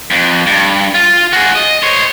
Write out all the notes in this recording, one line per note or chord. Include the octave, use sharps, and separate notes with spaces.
F2
G2
F4
F#4 G#4
D#5
C5 C#5